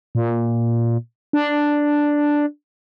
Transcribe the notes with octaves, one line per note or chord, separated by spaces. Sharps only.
A#2
D4